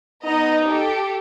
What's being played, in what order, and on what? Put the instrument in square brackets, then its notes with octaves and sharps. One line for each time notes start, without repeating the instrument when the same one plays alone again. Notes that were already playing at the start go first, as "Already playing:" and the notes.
[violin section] B3 D#5 A#5 [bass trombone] D#4
[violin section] G4 A4